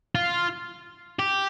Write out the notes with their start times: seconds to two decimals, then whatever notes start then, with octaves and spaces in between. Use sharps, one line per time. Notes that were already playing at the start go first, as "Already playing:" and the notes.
0.15 F4
1.19 G4